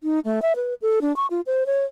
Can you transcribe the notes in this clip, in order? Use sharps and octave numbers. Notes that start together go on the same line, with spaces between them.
D#4
A3
E5
B4
A4
D4
C#6
F4
C5
C#5